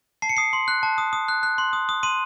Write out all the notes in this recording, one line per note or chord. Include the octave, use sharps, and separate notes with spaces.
A5 C7
C#7
D#6 C7
C6
F#6
A5
D#6
D#6
F#6
F#6
C6
D#6
D#6
C6 D#7